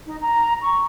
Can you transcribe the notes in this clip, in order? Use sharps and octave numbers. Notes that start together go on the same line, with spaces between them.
D#4
A#5
C#6